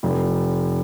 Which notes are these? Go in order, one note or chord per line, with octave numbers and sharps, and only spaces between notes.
F1